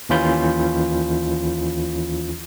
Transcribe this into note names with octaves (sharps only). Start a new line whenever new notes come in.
D#2 E3 C#4 F4 B5 G6